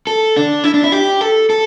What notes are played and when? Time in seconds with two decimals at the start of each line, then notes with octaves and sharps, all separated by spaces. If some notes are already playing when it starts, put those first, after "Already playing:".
0.07 A4
0.36 D4
0.64 E4
0.74 D4
0.84 E4
0.92 G4
1.21 A4
1.50 A4